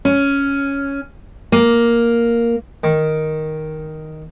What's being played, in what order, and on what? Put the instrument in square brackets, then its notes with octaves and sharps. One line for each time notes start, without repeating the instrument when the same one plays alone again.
[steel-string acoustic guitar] C#4
A#3
[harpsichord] D#3